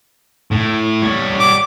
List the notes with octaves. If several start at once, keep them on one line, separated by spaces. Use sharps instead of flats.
A2
G3 C#5
D6